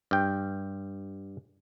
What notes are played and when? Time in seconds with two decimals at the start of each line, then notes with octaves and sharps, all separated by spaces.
0.11 G2 G5